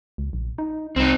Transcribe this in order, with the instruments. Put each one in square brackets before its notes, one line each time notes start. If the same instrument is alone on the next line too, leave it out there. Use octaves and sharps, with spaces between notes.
[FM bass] C#2
A#1
D#4
[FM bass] C2 [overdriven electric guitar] C4 D#4